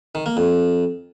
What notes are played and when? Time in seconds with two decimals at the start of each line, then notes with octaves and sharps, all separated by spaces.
0.15 D#3
0.26 A#3
0.37 F2